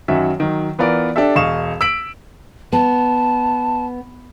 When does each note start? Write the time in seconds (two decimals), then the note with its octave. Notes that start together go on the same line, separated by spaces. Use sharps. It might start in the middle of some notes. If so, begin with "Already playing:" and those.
0.08 F#2 D#3 F#3 F#4 E5
0.40 D#3 F#3
0.79 E3 B3 F4 A#4 D5
1.16 D4 G4 A4 E5
1.36 E1 G#4 D#5 F5 C#6 E7
1.81 E6 B6 D7 F#7
2.73 B3 A5